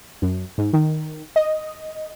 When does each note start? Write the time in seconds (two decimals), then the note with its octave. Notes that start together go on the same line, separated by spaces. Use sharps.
0.22 F#2
0.58 G#2
0.73 D#3
1.36 D#5